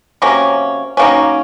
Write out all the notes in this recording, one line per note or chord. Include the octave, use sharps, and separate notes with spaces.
C3 F#3 A#3 C#4
D#3 F#3 A#3 C#4